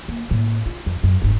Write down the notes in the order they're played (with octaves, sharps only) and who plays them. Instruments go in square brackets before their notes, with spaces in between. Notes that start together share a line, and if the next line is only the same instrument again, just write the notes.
[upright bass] A#3
A2 A#3
F4
F2
F#2
F#1 G#2